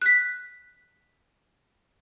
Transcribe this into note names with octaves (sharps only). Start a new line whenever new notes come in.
F#6 B6